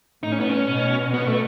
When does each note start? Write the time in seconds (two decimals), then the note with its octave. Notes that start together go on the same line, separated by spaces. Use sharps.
0.23 A2 D#4
0.32 C#4
0.40 B3
0.49 C#4
0.69 B2
1.14 B3
1.27 A3